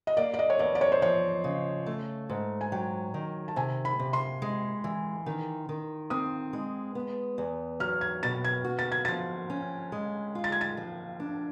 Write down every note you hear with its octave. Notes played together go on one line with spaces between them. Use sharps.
D#5
A#3 D5
D5
D#5
C#5
E2 D5
D5
C#5
C5
F3 C#5
C#3
A3
G#2
G#5
F#3 G5
D#3
A5
C3 G#5
B5
C3
C6
G#3
E3
D#3
D#3
C4 D#6
G#3
B3
E2
F#3 F6
G#6
B2 A6
G#6
F#4
A6
G#6
F3 A6
C#4
G#3
F4
A6
G#6
A6
F3
D4